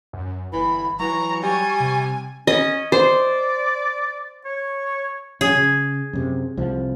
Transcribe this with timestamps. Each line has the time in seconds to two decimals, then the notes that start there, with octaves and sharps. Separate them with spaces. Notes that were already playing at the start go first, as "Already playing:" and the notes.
0.13 F#2
0.53 G1 E3 B5
0.99 E3 F#3 A#5 C#6
1.43 G3 G#5
1.80 C3
2.47 C#4 D#5
2.92 C5 D5
4.45 C#5
5.41 F#3 G3 C#4 G#4
5.55 C#3
6.13 F#2 C3
6.57 C2 F3